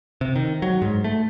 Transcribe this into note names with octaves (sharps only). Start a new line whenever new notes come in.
C3
D#3
F#3
G#2
A3